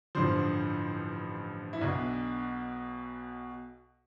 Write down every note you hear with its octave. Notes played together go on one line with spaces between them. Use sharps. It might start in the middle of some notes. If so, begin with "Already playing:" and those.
A1 G2 D3 F3 C5
E4
B1 B2 D4